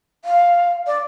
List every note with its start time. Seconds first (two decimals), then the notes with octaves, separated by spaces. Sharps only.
0.25 F5
0.86 D5